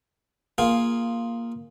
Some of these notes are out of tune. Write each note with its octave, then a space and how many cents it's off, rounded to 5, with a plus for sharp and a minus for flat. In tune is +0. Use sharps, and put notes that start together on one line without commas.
A#3 +0 F4 +0 G#4 +0